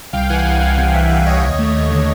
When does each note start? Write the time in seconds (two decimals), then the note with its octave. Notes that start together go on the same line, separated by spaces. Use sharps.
0.13 C2 F5 G5
0.29 E3 F#5 G#5
0.45 C2 F#5 G#5
0.62 C2 F5 G5
0.78 C3 F5 G5
0.94 C2 E5 F#5
1.10 E3 F5 G5
1.26 C2 C#5 D#5
1.42 D#2
1.59 A3
1.75 D#2
1.91 D3